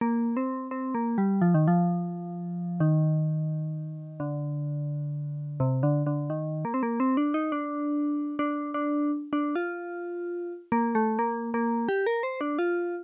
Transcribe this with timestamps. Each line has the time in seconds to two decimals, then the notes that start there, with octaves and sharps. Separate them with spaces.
0.01 A#3
0.37 C4
0.71 C4
0.95 A#3
1.18 G3
1.41 F3
1.54 D#3
1.68 F3
2.80 D#3
4.20 D3
5.60 C3
5.83 D3
6.06 D3
6.30 D#3
6.65 A#3
6.74 C4
6.83 A#3
7.00 C4
7.17 D4
7.34 D#4
7.52 D4
8.39 D4
8.74 D4
9.33 D4
9.56 F4
10.72 A#3
10.95 A3
11.19 A#3
11.54 A#3
11.89 G4
12.06 A#4
12.23 C5
12.41 D4
12.59 F4